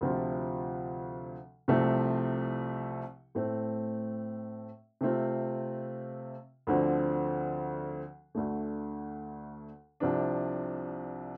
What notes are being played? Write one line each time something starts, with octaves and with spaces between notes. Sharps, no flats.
D2 C3 F3 C4 F4
C2 C3 F3 A3 C4
A2 A3 C4
C3 A3 C4 F4
D2 D3 F3 C4
D2 D3 A3
C2 C3 F3 D4